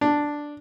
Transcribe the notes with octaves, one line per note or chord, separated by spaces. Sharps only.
D4